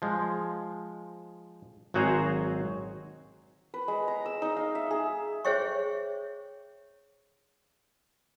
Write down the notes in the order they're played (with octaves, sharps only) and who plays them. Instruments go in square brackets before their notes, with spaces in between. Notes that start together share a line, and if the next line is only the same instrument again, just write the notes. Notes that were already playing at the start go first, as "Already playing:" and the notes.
[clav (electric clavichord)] F3 G#3
G#1 F#3 F#4 G#4 C5 A#5
[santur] B4
G#3
A#5
E6
D#4
F5
E5
G#4
[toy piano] G#4 C5 C#5 E5 G5 C#6